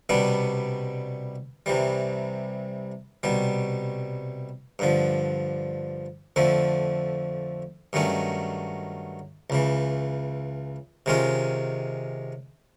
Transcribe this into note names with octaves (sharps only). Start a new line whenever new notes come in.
C2 B2 G3 B3 D4
C2 C3 E3 G3
C2 B2 G3
G2 D3 F3
F2 D3 F3 A3
G2 D#3 F#3 A3 C#4
C#2 C#3 E3
C3 D#3 G#3 C#4 F4